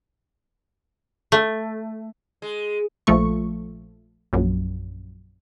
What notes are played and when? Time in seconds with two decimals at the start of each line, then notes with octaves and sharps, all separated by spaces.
1.32 A3
2.42 G#3
3.07 A#1 F3 A3 C#6
4.33 A#1 F#2